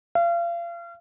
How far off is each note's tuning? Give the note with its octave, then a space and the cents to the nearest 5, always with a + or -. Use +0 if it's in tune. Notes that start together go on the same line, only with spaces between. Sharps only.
F5 -35